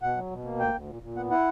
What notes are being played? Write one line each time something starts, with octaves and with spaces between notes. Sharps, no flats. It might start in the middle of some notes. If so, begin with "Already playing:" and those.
B2 F#5
F#3
B2
A#3
D2 G5
D2
A#2
A#2
B3 F#5
E4 F#5